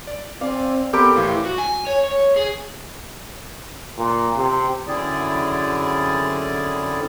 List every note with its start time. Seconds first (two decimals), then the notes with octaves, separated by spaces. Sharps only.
0.07 D5
0.41 C4 D5 F5 G#5
0.93 B3 C4 G4 A4 A#4 B5 D7
1.16 A2 E3 F5
1.45 F#4
1.58 G#5
1.87 C#5
2.04 C#5
2.36 G#4
3.98 A#2
4.37 C3
4.87 F#2 D3 C4 E4 G#4 D5